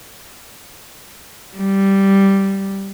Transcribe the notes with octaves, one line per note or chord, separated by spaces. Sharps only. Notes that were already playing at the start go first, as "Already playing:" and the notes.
G3